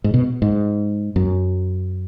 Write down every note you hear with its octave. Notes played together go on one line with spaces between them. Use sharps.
G#2
B2
G#2
F#2